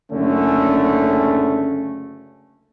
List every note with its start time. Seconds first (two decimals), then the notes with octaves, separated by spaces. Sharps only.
0.11 F#1 D3 A3 C#4